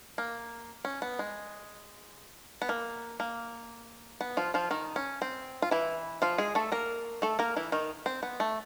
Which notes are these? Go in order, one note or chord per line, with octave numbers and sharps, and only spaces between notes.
A#3
C#4
B3
G#3
B3
A#3
A#3
B3
F3 F4
F3 F4
D#3 D#4
C#4
C4
F4
E3 E4
F3 F4
G#3 G#4
A3 A4
A#3 A#4
A3 A4
A#3 A#4
E3 E4
D#3 D#4
C4
B3
A3